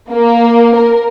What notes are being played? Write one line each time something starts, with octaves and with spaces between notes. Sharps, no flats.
A#3
A#4